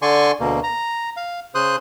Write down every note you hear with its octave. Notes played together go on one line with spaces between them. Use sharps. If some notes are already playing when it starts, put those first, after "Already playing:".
D3 D5 G#5 C6 C#6
D2 B2 A#3
A#5
F5
C#3 C5 C6 D#6 F#6